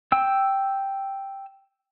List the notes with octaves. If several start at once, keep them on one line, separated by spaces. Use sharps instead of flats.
G5 E6